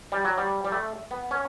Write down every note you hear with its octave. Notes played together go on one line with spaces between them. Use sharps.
G3
F#3
G3
G3
A3
B3
C#4